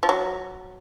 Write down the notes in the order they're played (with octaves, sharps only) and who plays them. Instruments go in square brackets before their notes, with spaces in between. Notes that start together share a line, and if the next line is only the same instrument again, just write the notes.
[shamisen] F3
F#3